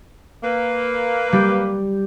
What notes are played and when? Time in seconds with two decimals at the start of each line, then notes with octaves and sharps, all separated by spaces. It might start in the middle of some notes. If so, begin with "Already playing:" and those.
0.43 A#3 B4
1.32 G3 G4